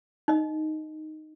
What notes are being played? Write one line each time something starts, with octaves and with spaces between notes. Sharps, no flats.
D#4 D#5